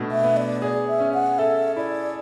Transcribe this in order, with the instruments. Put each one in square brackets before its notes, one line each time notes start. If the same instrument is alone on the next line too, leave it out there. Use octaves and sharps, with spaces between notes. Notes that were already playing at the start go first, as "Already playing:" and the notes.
Already playing: [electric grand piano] B2 A3 D4
[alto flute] E5
[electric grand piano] B3
[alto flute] D5
[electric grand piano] G#4 [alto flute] D5
[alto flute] E5
[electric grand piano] C#4
[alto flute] F#5
[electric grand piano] A4 [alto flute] E5
[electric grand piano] E4 [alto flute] D5